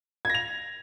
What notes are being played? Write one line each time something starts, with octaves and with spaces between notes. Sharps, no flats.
G#6 A#6 F7